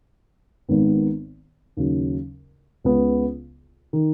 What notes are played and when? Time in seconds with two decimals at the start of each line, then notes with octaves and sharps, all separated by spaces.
0.69 G#1 G#2 D#3 B3
1.77 D#2 C#3 F#3
2.85 C#2 C#3 B3
3.93 D#3